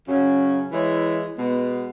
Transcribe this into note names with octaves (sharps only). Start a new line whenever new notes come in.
F#2 C#3 F#3 C#4
E3 G#3 E4 C#5
B2 G#3 B3